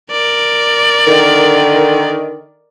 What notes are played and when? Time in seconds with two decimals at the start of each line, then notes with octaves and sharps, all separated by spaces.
0.11 A#4 D5
1.08 D3 D#3